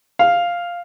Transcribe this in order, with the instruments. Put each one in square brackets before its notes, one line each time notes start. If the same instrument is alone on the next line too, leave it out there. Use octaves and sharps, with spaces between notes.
[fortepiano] F5